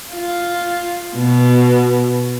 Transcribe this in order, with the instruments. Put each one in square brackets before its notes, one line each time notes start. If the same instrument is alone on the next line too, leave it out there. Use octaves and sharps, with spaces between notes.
[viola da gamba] F4
B2